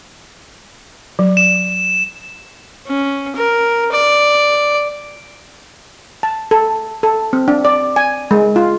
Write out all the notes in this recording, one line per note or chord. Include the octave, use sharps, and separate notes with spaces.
F#3
E7
C#4
A#4
D5
A5
A4
A4
C4
D4
D5
G#5
G#3
F4